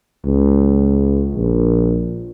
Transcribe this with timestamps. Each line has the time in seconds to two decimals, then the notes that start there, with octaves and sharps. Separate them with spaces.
0.25 C#2
1.34 A#1